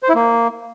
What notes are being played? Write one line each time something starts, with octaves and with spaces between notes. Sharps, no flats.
C5
E4
A#3